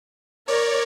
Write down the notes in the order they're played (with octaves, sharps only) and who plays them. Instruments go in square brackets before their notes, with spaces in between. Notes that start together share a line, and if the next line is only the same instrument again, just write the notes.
[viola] A#4 [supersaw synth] C#5 D5